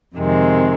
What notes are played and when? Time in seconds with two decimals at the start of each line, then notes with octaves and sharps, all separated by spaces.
0.16 F2 C3 D#3 G#3 C4